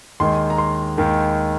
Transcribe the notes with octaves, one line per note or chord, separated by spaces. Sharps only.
D#2 D#3 G#3 C6
A#5
C6
D#2 D#3 G#3